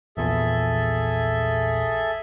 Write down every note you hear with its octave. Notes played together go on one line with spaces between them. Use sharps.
A#1 E2 A#2 G#4 A4 E5